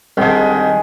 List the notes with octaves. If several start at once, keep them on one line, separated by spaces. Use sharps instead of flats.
C2 D3 D#3 G#3 G#4